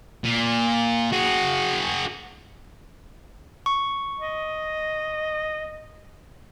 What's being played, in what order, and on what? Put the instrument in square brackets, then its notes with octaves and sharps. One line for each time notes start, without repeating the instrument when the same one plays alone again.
[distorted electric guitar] A#2
F#4 G#4
[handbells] C#6
[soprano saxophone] D#5